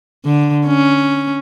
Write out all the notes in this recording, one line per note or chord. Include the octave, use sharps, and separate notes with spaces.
D3
C#4